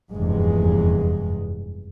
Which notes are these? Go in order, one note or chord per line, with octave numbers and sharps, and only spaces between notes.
F1 E2 G2 G#3